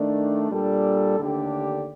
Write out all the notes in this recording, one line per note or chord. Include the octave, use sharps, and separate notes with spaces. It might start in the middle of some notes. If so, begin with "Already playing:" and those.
Already playing: D#3 A3 D4
A#2 G3 D4 A4
D#2 D3 A3 D4 G4